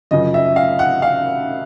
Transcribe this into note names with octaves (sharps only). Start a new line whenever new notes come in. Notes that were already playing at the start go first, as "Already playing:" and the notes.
F#2 C#3 F3 D#5
E5
F5
F#5
F5